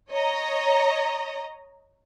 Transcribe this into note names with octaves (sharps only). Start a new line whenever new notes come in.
C#5 D#5 A#5